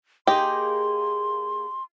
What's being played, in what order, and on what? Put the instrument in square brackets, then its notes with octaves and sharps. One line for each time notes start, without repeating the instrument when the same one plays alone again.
[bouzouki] A#3 G#4 [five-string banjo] D#4 G4 [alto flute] C6